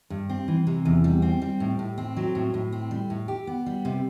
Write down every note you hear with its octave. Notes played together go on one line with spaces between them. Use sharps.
G2
C4
E3
C3
E2
G3
C4
G3
A2
A2
C4
F#3
A2
A2
C4
G3
A2
G4
B3
G3
C3